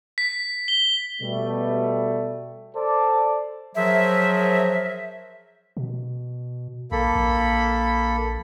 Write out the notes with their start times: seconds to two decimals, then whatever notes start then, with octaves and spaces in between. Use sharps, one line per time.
0.18 B6
0.68 G7
1.22 B2 G3 A3
2.75 A4 C5 D5
3.76 F3 F#3 G#4 A#4 C5 E5
5.77 B2
6.92 A#1 A#3 A4 B5
7.15 A#1